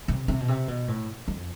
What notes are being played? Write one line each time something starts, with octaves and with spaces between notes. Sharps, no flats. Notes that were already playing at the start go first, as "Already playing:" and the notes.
C3
C3
B2
C3
B2
A2
F2